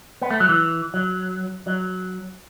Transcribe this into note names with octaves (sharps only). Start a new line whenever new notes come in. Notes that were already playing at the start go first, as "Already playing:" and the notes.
B3
A3
F#3
E3
F#3
F#3